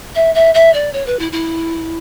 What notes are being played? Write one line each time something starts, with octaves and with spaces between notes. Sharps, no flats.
E5
E5
E5
D5
C#5
B4
E4
E4